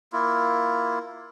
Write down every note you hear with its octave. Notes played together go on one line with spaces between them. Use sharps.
A#3 E4 F4